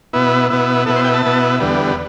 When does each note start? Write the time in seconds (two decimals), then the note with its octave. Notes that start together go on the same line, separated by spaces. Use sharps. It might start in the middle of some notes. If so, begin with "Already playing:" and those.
0.13 B2 B3 E4
0.50 B2 B3 E4
0.86 B2 B3 E4 A4
0.96 C5
1.04 G5
1.14 A5
1.23 B2 B3 E4
1.60 E2 D3 G3 B3